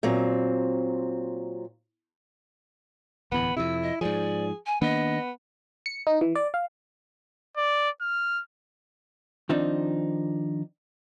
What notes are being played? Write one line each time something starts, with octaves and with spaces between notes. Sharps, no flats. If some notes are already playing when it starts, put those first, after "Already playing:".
A#2 F#3 C4
D1 E2 B3 B5
F2 C3 E4 E6
D#5
G#2 F3 G#4 D5
G#5
D#3 A#3 B3 D4 D#5
C#7
D#4
E3
D5
F5
D5
F6
D#3 F3 C4 D4 D#4